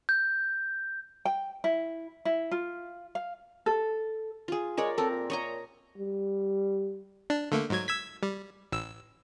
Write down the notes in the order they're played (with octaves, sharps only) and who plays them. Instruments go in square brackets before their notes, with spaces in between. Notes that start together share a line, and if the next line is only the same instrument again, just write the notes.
[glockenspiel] G6
[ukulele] G5
E4
E4
F4
F5
A4
[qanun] F4 G#4
[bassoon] G#3 [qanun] A#4 C#5 D5
[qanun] C4 A#4 [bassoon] A4
[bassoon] A#2
[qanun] C#5 D#5 A#5
[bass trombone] G3
[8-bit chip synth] D4
D3 A3 A#3
G#2 F#3 G#6
E6 G#6 B6
G3
A1 E6